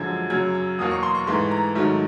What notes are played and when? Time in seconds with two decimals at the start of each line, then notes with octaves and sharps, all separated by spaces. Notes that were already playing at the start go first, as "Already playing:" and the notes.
Already playing: F#2 D3 F3 G#3 G#6
0.30 F#2 C#3 F#3 G#6
0.54 E6
0.78 E2 B2 F#3 A#3 D#6
0.91 C#6
1.03 C6
1.15 C#6
1.27 G#2 E3 A3 C6
1.51 A#5
1.75 G#2 D#3 F#3 A3